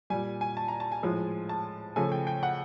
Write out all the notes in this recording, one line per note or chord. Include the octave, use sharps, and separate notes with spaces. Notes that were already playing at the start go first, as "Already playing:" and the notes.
A#2 G3 G#5
G#5
A5
A#5
A5
G#5
A2 F3 G#3
A5
C#3 F3 A3 G#5
G5
G5
F#5